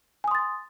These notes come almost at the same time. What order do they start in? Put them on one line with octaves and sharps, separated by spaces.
G#5 D#6 C6 A6